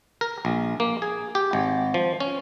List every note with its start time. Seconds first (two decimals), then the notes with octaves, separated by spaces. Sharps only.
0.21 A#4
0.45 A#1
0.80 A#3
1.02 G#4
1.35 G4
1.53 G#1
1.94 F3
2.20 C#4